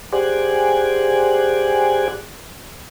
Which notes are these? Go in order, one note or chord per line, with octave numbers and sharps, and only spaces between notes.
G4 G#4 C5 D5 F#5 G#5